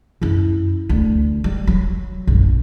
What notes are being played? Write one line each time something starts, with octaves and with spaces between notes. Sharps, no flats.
F#2 E4
D2
G3
F#3
A#1 F#2